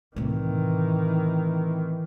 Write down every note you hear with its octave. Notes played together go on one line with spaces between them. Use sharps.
A2 C3 D#3 E3